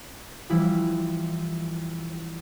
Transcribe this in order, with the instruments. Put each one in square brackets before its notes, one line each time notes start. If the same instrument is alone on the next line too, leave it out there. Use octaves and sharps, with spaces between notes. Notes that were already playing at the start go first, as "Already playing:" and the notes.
[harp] E3 F3 G3 E4